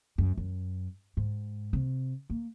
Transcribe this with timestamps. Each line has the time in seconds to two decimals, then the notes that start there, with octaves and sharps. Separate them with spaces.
0.18 F#2
0.37 F#2
1.17 G#2
1.73 C3
2.30 A#3